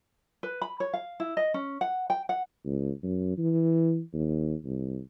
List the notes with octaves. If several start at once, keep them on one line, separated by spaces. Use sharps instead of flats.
B4
B5
C#5
F5
E4
D#5
C#4
F#5
G5
F#5
C#2
F#2
E3
D#2
C2